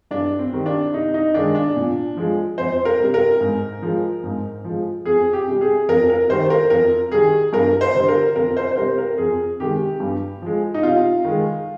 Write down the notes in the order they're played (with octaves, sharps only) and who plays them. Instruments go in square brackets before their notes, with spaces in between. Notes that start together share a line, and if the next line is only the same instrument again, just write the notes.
[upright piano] G2 D4
C4
D#3 G3
D4
C3 D#4
D#4
D#3 G#3 D4
D4
A#2
F3 G#3
F2 C5
A#4
C3 G3
A#4
G#2
F3 G#3
G#2
F3 G#3
F2 G#4
G4
C3 G3
G#4
F2 A#4
A#4
D#3 G3 C5
A#4
F2 A#4
D#3 G3 G#4
G2 A#4
C5
D3 G3
A#4
F2 A#4
C5
C5
C3 G3 A#4
A#4
F2 G#4
C3 D#3 G#3 G4
G2
F3 G#3
D#4
C3 F4
D#3 G#3